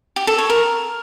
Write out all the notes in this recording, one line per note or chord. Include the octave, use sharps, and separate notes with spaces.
G4
A4
C#5
A#4